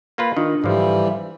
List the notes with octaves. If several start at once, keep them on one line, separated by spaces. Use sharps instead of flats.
A#3 F4 B4
D#3 D4 F4
G#2 D3 E3 F3 G3
E5